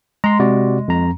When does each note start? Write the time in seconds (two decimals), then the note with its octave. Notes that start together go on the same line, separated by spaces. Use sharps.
0.24 G#3 A#5 C6
0.39 C3 F#4 D5
0.88 F2 A#5